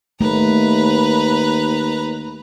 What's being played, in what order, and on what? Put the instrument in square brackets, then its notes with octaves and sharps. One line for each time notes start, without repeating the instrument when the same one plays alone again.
[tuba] D#2 [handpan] A3 [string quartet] B4 A#5